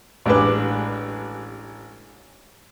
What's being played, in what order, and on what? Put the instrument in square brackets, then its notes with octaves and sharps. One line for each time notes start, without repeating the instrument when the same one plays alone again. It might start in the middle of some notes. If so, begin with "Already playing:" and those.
[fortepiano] A1 G#3 D4 G4 B4